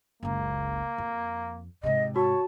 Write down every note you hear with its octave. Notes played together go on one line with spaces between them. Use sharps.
F#1 C#2 A#3
F2
G#2 C3 D#5
F#4 C#5 A5